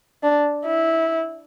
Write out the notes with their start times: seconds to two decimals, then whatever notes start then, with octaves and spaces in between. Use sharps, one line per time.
0.23 D4
0.65 E4